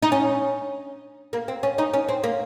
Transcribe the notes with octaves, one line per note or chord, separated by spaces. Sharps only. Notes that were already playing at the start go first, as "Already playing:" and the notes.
D#4
C#4
A#3
C4
C#4
D#4
C#4
C4
A#3